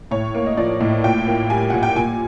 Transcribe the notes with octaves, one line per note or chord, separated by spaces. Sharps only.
A2 C#5
A#3
D#5
F3 D5
A2
A#2 G5
A#3
G3 G#5
A#2 F#5
G5
A#2 G#5